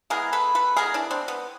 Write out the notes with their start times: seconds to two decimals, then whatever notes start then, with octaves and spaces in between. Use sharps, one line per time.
0.10 E3 G#3 B3 G#4 A#4
0.33 A4 B4
0.55 A4 B4
0.77 E3 G#3 B3 G#4 A#4
0.94 D4 E4
1.11 C4 D4
1.28 B3